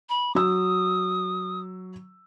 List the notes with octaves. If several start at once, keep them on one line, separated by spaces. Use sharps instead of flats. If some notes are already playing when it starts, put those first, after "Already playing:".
B5
F#3 D#6 E6